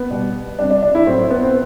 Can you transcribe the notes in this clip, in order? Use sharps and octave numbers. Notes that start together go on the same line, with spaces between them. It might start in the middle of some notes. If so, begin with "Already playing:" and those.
Already playing: B3
B2 G3
C3 G3 D4
D4
D4
E4
A2 F#3 C4
B3
C4